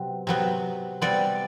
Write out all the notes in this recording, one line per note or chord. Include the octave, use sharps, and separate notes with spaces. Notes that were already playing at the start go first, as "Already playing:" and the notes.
Already playing: C3 F#3 B3
C3 F#3 B3
C3 G3 B3 D5